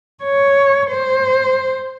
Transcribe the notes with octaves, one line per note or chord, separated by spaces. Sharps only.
C#5
C5